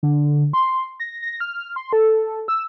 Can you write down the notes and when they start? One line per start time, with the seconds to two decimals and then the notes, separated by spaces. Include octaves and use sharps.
0.03 D3
0.53 C6
1.00 A#6
1.22 A#6
1.40 F6
1.76 C6
1.93 A4
2.48 E6